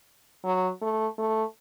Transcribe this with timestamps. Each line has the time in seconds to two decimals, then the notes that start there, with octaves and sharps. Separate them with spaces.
0.44 F#3
0.81 A3
1.18 A3